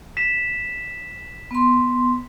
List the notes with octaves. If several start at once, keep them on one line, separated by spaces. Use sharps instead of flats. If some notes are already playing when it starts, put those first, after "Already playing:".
B6 E7
B3 C6